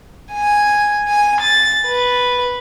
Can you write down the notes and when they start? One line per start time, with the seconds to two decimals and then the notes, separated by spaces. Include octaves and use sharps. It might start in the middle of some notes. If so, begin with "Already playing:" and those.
0.33 G#5
1.08 G#5
1.41 A6
1.87 B4